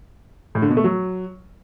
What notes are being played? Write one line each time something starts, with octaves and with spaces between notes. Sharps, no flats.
A2
D3
B2
A3
F#3